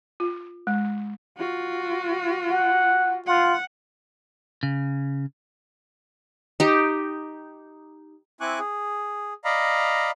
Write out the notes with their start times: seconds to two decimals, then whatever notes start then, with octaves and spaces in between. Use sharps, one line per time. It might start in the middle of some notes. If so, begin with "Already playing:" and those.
0.20 F4
0.67 G#3
1.38 F4 F#4
2.51 F#5
3.27 F4 F#5
4.63 C#3
6.60 D#4 G4
8.41 C4 E4 G#5 C#6 D6 F#6
8.59 G#4
9.44 D5 D#5 F5 A#5 B5